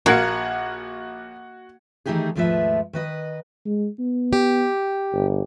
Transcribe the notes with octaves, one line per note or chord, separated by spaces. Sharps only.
A#1 A#3 F#4 F5 F#5 F#6 G#6 C#7
D#3 E3 A3 D#4 G4 G#4
D#2 G#2 F3 A3 B4 E5
D#3 B4 D#5
G#3
B3
G4
G1